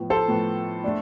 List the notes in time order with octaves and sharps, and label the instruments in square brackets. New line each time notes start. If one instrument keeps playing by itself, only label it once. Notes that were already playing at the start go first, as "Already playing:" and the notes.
Already playing: [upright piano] A2 F3 B3
[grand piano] A4 C5
[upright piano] A2 F3 B3
A3 D4